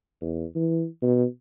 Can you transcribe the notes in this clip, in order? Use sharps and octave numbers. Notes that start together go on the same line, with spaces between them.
E2
E3
B2